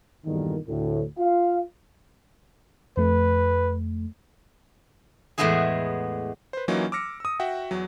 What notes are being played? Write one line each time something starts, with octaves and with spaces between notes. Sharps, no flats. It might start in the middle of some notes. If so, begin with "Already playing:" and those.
E2 G2 A#2 D3 D#3
D2 A2
F4 F5
F2 A3 B4
E2 A2 G#3 B3 E4 G#4
B4 C5
E3 F#3 A#3 C#4 D#4 F4
D6 E6 F6 A#6 C#7
D#6 E6
F#4 E5 F#5 G5
E2 F#3